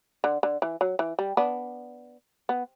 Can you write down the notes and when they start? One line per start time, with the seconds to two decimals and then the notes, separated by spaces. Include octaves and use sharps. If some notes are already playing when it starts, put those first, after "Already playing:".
0.24 D3
0.43 D3
0.62 E3
0.81 F#3
0.99 E3
1.19 G3
1.37 B3 D4
2.49 B3